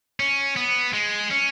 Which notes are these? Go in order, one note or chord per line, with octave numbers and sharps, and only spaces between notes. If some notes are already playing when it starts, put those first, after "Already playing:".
C#4
B3
G#3
C#4